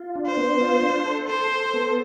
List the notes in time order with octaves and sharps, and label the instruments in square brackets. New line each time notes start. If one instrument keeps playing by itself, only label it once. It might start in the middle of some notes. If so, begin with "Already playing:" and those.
Already playing: [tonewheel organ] F4
D4
[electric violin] C5
[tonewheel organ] B3
F4
D4
A4
[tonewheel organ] A4 [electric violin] C5
[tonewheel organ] A4
B3